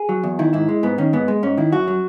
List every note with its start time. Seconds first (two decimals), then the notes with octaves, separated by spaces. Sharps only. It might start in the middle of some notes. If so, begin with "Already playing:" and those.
Already playing: G#4
0.09 F#3
0.23 E2
0.39 D#3 E4
0.53 G#2 E4
0.69 G#3
0.83 G#2 B3
0.98 D#3 C#4
1.13 G#2 B3
1.28 G#3
1.43 G#2 C#4
1.57 D#3 E4
1.72 F#2 F#4
1.88 F#3